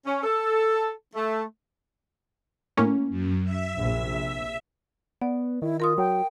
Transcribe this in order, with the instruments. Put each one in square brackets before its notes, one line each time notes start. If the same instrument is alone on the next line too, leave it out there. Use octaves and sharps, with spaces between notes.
[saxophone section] C#4
A4
A3
[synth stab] A2 A#3 C#4
[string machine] F#2
E5
[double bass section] A#1 C3
[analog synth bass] B3 [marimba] D5
[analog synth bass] D#3 [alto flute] E4
[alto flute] F4 [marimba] A#4 C6 D#6
[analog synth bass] F#3 [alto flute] G5